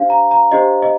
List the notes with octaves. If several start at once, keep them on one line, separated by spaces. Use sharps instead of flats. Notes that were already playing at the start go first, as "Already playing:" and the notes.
Already playing: D4 G4 C5 F5
A#5
A#5
D4 G4 C5 D#5
D#5